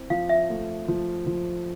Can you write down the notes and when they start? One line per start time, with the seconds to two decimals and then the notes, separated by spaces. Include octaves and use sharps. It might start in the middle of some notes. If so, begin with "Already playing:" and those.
Already playing: C4 E4
0.10 F3 F5
0.29 E5
0.50 A3
0.88 F3
1.27 F3